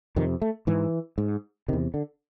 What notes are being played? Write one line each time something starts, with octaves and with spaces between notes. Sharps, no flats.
F2 C3 D#3
A3
G#2 E3
G#2
E2 C3 D#3
D3